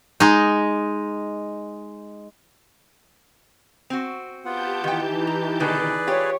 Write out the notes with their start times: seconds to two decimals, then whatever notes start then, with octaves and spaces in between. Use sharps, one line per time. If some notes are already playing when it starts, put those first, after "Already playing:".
0.20 G#3 D#4
3.90 C4 F#4
4.45 B3 F4 G4 F#5 A5 G6
4.84 D#3 E3 D#4 G5
5.27 E4 A#5
5.60 B2 D3 D#3 G#4 B4 D5
6.07 F4 G4 C#5